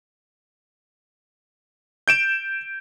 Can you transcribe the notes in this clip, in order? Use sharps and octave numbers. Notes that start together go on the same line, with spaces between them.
G6 D7 E7